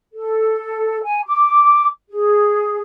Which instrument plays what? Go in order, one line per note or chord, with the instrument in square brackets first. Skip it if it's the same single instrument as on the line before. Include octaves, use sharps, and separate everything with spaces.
[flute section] A4
G#5
D6
G#4